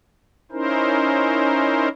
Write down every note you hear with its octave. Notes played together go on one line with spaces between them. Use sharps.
C#4 D#4 E4 A#4 C5